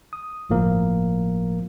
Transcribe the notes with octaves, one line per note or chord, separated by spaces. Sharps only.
D#6
G1 A2 F3 A#3 A#4